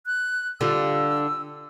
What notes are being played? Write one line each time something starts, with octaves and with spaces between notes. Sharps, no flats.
F#6
D3 G3 F4 E6